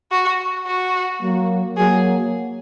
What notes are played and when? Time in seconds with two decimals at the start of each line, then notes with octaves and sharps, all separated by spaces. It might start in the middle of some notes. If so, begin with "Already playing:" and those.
0.11 F#4
0.66 F#4
1.22 F#3 A#3
1.77 F#3 A#3 G#4